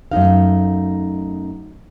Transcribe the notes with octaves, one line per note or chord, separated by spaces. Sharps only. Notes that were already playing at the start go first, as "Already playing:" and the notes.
F#2 A3 D#4 F5